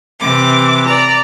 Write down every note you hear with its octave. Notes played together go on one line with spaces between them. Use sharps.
C3 E3 D6
D5 A#5